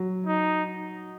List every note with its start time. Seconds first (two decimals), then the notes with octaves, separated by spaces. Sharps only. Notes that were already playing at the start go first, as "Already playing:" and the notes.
Already playing: F#3
0.27 D#4